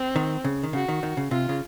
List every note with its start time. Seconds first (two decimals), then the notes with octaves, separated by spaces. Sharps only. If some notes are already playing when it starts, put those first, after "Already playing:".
Already playing: C4
0.16 D#3
0.44 C#3
0.63 D#3
0.73 C#3 F#4
0.88 D#3
1.03 D#3
1.17 C#3
1.31 C3 F4
1.49 C#3